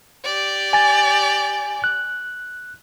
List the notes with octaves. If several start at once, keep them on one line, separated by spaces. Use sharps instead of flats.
G4 D5
G#5 A6
F#6